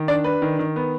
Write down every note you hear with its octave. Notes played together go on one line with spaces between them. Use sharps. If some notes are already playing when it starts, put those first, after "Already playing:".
Already playing: D#3
D4 D5
D4 B4
D#3
D#3
B3